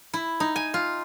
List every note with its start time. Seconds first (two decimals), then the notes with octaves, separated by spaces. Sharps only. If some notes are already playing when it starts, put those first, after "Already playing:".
0.13 E4
0.40 D#4
0.56 G#5
0.74 F4